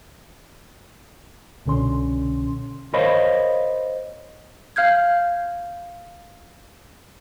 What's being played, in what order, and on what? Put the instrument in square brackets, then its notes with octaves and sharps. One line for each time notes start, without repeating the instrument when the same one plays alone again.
[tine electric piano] C2 B2 D3 C#4 C6
[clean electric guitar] A#4 C5 C#5 D#5 F5 B5
[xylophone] F5 F6 G6 G#6